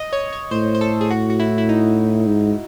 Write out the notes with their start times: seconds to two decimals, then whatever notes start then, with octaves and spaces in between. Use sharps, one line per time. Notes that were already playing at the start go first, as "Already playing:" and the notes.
Already playing: D#5
0.13 C#5
0.33 C#5
0.51 A2 C5
0.75 C5
0.81 A4
1.01 G#4
1.10 F#4
1.30 F#4
1.39 E4
1.58 E4
1.69 D#4
2.27 G#2